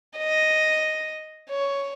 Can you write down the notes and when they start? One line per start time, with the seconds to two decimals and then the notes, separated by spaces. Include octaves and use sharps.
0.18 D#5
1.50 C#5